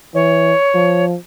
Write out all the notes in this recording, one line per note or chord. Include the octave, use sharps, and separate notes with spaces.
E3 C#5
F3